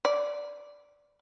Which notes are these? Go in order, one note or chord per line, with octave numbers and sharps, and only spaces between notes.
D5